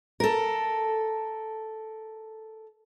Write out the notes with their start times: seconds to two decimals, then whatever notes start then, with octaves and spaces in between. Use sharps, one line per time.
0.20 A4 A#4